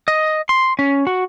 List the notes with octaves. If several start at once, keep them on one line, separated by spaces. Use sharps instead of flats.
D#5
C6
C#4
F#4